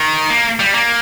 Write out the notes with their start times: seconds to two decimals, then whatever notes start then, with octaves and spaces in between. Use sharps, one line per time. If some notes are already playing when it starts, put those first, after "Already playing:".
Already playing: D#3
0.30 A#3
0.60 G3
0.74 A#3